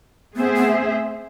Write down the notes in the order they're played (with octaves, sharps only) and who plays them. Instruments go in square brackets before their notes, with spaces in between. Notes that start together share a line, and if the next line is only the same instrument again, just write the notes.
[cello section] A3 C4 G#4 C5 E5 [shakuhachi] B3
[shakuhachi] B3